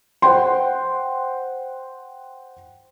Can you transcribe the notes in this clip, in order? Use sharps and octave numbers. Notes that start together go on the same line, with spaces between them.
C5 F#5 G5 C6